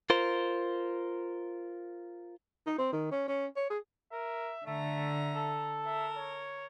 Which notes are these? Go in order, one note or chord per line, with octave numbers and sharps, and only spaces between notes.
F4 A#4 C5
D#4
C4
D#3
C#4
C#4
C#5
G#4
A#4 E5
D3 A3 E5 A#5
A4
A#4 E5
C#5